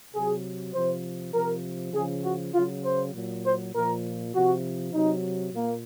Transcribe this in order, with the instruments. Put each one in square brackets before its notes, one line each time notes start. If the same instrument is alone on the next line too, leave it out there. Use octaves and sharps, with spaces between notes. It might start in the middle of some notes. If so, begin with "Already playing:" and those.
[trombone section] C3 F#3 G#4
C3 F3 C5
C3 F3 A#4
C#3 F3 G#4
F#4
C#3 F#3 F4
C5
A#2 F#3
C5
A#2 F3 A#4
C3 F3 F#4
C3 F#3 D#4
A#2 A#3